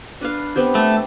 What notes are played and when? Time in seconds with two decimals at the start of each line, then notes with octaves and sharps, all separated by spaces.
0.21 D4 B4 F5
0.56 B3 C4 G4
0.75 A3